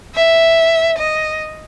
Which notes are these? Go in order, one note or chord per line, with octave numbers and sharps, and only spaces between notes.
E5
D#5